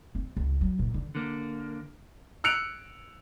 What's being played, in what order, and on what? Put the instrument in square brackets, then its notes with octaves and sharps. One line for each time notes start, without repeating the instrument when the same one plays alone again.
[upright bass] C4
C#2
F#3
A#2
D3
[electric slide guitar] D3 A#3
[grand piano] E6 F#6 C#7 D7 F7